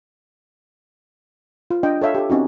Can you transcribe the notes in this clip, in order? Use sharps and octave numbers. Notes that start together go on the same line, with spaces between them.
F4
D4 D#5 G5
A4 C#5 E5 F5
G4 A4
C4 C#4 D#4 F#4